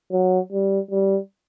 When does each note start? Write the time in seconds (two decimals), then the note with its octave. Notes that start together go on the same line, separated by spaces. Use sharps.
0.12 F#3
0.52 G3
0.91 G3